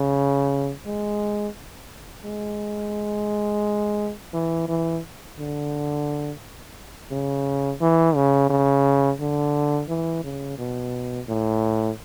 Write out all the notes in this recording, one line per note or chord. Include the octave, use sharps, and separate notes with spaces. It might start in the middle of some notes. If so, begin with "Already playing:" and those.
Already playing: C#3
G#3
G#3
E3
E3
D3
C#3
E3
C#3
C#3
D3
E3
C#3
B2
A2